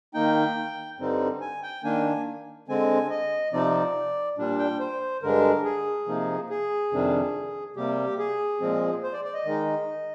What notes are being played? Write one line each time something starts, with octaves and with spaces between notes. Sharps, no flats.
D#3 A#3 D#4 G5
G2 D3 G3 C4 D#4
G#5
G5
D#3 A#3 D4 G#5
D3 G#3 C4 G#5
D#5
C3 F3 C4 D#4 D5
A#2 G3 D4
G5
C5
G2 D3 G#3 D4 A#4
G#4
C3 F3 A#3 D#4
G#4
F2 C3 D#3 G3 D4
C3 G3 A#3 G4
G#4
A#2 F3 G#3 C4
C5
D5
D5
D#5
D#3 G#3 D#4